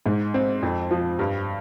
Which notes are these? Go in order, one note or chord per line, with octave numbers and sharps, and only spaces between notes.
G#2
C4
F2
F3
G2